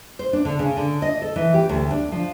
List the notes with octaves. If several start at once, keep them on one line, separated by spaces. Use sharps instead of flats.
C5
D4
D3
C#3
D3
D#5
A4
E3
G4
D2
D4
F3